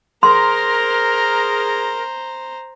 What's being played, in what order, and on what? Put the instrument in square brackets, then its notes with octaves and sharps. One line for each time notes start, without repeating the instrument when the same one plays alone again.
[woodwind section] G#4 A#4 [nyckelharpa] C5 A#5 [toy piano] C6